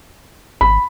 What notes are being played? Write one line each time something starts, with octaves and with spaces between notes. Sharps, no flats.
G#1 B5